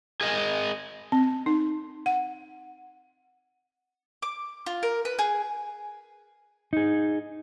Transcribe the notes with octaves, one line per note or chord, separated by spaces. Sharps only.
G#4 A#4 D#5 F#5 G#5
C4
D#4
F#5
D6
F4
A#4
B4
G#4
D#4 G#4